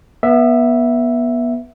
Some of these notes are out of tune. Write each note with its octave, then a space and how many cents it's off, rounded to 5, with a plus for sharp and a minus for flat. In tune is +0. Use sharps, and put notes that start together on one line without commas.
B3 -25 E5 +0